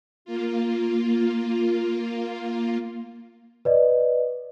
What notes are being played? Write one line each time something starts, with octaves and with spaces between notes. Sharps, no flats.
A#3 F4
B4 D5 D#5